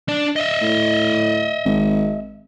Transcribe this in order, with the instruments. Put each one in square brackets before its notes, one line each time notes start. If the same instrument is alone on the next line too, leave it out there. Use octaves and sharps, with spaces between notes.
[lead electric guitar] D4 D5
D#5 E5
[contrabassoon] A2
G#1